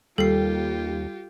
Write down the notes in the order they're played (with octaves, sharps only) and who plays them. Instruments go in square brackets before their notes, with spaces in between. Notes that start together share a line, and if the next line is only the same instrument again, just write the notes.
[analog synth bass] D#2 [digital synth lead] G3 [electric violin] F4 G4 [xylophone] A4 C7